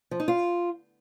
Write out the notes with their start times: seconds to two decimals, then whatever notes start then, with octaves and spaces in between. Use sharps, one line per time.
0.11 F3
0.20 D#4
0.28 F4